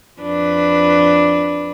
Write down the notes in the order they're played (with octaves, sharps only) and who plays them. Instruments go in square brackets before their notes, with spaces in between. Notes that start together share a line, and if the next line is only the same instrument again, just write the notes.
[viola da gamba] F2 D4 B4